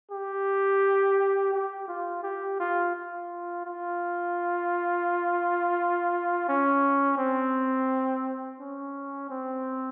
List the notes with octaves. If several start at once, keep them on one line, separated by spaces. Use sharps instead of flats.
G4
G4
F4
G4
F4
F4
F4
C#4
C4
C#4
C4